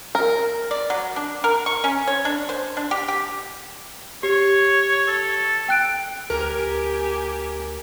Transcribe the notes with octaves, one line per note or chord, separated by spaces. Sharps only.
A#4
D5
F#3
D4
A#4
C#6
C#4
C#5
D4
C5
D4
G4
G4
G4 C#5
A4
G5 F#6 D7
D2 G4 A#4 G#5